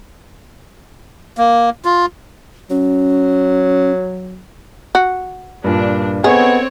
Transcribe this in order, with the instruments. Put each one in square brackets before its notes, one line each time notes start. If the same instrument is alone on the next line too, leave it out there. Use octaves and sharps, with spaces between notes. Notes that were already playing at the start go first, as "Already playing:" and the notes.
[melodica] A#3
F4
[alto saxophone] F#3 [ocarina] C#4
[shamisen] F#4
[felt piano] G2 A#2 [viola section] D4
[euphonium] B3 [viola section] C4 C#5 [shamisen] G#4 [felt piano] A4 D#5